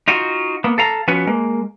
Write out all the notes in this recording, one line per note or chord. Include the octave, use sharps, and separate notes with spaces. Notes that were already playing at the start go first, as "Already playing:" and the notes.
D#4 F4 F#4
A#3 B3
A4 F5 A#5
F3 B3 C#4 F#4 B4
G#3 A#3